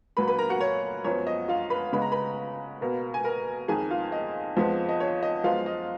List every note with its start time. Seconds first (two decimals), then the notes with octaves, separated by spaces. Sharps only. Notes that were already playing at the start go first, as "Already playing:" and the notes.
0.17 A#2 F#3 A#3 B4 B5
0.28 B4 B5
0.39 A#4 A#5
0.50 F#4 F#5
0.61 C#5
1.04 F#2 F3 B3 C#5
1.27 D#5
1.48 F4 F5
1.70 B4 B5
1.93 C#3 G#3 B3 B5
2.02 A#5
2.12 B4 B5
2.81 B2 A#3
3.14 G#5
3.24 A#4 A#5
3.68 F2 D#3 A#3 G#4 G#5
3.91 F4 F5
4.12 D#5
4.57 F2 F3 G#3 B3
4.89 D#5
5.00 C#5
5.23 D#5
5.44 F#2 F3 G#3 B3 F4 F5
5.66 D#5